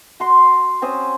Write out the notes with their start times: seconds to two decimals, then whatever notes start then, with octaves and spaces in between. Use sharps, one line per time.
0.20 F#4 C6
0.82 C4 C#4 C5 D#6